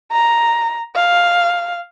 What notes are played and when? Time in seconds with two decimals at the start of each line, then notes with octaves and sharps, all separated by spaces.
0.12 A#5
0.95 F5